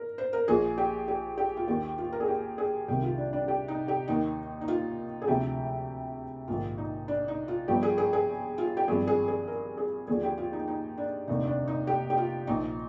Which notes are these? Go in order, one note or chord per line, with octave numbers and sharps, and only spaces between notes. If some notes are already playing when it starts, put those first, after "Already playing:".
Already playing: A#4
C5
A#4
A#1 A#2 F3 G#4
G4
G4
G4
F4
D#2 D#3 G4
F4
A#4
G#4
G4
G#4
C2 C3 D#3 G4
F4
D4
D4
G4
D#4
G4
D#2 D#3 D#4
D#4
F4
G#4
D2 C3 F3 G4
A#1 G#2 D#3 F4
D#4
D4
D#4
F4
G1 G2 F3 G4
G#4
G#4
G#4
F4
G4
G#1 G2 F3 G#4
G#4
G#4
A#4
G#4
D#2 D3 F3 G#4
G4
F4
D#4
D#4
D4
F1 D#2 D3 D#4
D4
D#4
G4
G4
F4
A#1 A#2 F3 D#4